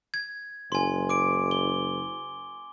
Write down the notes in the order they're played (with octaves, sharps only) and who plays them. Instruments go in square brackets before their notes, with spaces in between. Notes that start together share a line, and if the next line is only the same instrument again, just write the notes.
[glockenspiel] G#6
[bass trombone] F#1 [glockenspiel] G#5 C6
[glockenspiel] D6 D7
G7